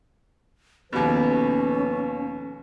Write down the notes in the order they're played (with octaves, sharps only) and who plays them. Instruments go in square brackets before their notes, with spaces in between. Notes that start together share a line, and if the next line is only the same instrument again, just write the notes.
[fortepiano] D#2 B2 [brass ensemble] F3 A4 B4 [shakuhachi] C#4